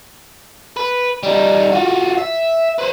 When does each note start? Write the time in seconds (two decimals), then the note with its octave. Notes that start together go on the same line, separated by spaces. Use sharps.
0.77 B4
1.23 G3 D#4
1.72 F4 F#4
2.18 E5
2.78 B4 C5